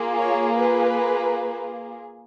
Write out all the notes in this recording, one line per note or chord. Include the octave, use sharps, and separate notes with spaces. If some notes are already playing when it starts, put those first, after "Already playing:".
Already playing: A#3 F4 G#4
C#5
B4